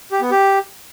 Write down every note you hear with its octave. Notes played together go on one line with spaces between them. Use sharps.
G4
B3
G4